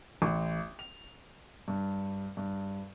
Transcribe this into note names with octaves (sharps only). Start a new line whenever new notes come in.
A1
F7
G2
G2